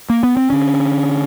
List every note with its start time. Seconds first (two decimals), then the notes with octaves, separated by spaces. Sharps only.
0.10 A#3
0.23 B3
0.37 C4
0.50 D3 C#4